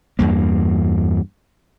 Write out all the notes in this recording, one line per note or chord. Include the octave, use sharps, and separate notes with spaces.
E2 G2 A#3